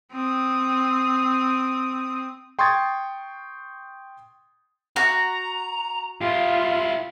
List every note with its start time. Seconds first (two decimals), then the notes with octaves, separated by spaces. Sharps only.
0.12 C4 D#6
2.59 G5 C6 C#6 D#6 G#6 A6
4.96 F#4 A#5
6.21 E4 F4 G4